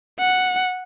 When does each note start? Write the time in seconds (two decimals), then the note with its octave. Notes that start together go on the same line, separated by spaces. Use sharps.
0.19 F#5